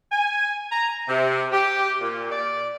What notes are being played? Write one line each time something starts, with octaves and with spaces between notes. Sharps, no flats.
G#5
A#5
C3
G4
A#2
D5